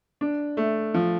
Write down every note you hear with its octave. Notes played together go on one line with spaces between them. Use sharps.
D4
A3
F3